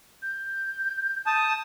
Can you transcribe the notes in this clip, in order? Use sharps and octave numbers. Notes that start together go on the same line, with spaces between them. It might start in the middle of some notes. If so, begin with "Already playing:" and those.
G6
A5 D#6